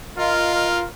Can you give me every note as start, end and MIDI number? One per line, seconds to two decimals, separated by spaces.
0.18 0.82 65
0.18 0.54 70
0.18 0.67 75
0.55 0.86 70